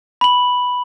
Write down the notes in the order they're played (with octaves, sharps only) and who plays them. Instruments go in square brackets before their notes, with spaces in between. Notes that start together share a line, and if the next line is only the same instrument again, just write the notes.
[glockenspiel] B5 F#7